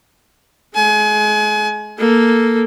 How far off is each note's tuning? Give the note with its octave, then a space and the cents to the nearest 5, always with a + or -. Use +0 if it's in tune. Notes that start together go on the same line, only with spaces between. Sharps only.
G#3 +30 G#5 +30
A#3 +0 A4 +0